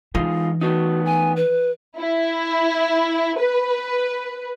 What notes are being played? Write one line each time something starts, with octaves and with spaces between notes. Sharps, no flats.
E3 G#3 D#4 F4
A3 B3 D#4 F#4
G#5
B4
E4
B4